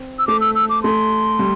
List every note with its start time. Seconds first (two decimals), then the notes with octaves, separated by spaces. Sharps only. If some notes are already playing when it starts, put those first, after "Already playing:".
Already playing: C4
0.19 E6
0.27 A3 D6
0.41 E6
0.55 E6
0.70 D6
0.83 A3 C6
1.39 G3